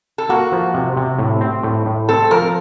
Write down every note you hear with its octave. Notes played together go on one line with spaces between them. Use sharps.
A4
A#3 F#4
F3
C3
C3
A2
C4
A2
A2
C4 A4
F3 A#4